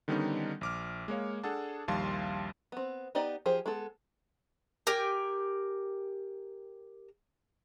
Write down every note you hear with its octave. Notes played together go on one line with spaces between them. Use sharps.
D3 D#3 G3 B3 C#4 D#4
A#1 D6 F6
G#3 A#3 C#5 F5
D4 G#4 A4 F#5 A5
A#1 D#2 G3 F5 A5 C6
B3 C4
B3 D#4 G4 D5 D#5
F3 G4 G#4 C5
G#3 B3 A4
G4 A#4 G5 G#5